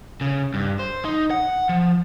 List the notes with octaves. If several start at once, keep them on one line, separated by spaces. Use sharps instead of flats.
C#3
G2
C5
D#4
F#5
F3